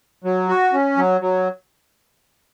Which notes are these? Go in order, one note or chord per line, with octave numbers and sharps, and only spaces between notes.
F#3
F#4
C#4
F#3
F#3